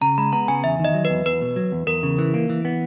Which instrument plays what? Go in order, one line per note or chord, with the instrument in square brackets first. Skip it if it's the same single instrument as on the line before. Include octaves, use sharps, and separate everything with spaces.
[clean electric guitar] C#3 [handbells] A#5
[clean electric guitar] G#3 [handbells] B5
[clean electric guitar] B3 [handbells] A#5
[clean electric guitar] C#3 [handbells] G#5
[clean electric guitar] E2 [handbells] E5
[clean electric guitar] D#3 [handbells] D#5
[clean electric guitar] F#3
[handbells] B4
[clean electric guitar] E2
[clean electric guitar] E2 [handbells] B4
[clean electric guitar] B2
F#3
E2
[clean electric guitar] E2 [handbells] A#4
[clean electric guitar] C#3
E3
A#3
E3
B3